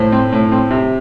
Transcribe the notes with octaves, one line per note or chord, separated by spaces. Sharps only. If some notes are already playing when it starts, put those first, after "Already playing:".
Already playing: A2 C5
C4
A2
C4
C3